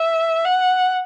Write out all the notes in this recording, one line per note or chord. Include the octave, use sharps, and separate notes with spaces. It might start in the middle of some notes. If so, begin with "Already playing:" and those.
Already playing: E5
F#5